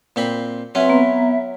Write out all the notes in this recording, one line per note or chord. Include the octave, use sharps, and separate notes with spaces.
A#2 C4 B5
F#3 C4 C#4 B4 E5 C6
B3 A#5